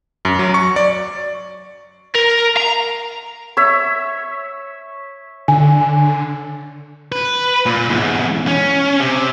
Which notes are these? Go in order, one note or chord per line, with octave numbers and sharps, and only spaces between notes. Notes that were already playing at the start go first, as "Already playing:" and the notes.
F#2
F#3
C#6
D5
A#4
A#5
C#5 E5
D3 G#5
B4
A#2
E2 G#2
C#4
C3